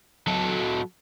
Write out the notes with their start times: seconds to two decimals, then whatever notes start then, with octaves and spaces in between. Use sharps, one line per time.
0.28 F#3 A4